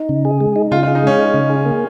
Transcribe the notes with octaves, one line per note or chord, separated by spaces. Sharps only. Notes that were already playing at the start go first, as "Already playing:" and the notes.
Already playing: D#4
C#3
G#4
G#3
D#4
C#3 F4
F4
G#4
D#4
G#3 C#4
D#4
C#3
G#4
A#3